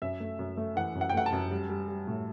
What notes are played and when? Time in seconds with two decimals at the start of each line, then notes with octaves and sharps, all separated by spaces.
0.02 F#2 E5
0.20 A3
0.39 F#2
0.57 A3
0.76 E3 F#5
0.95 F#2
1.01 F#5
1.10 G5
1.14 A3 F#5
1.26 A5
1.32 F#2
1.51 G3
1.69 G3
1.88 G3
2.07 A2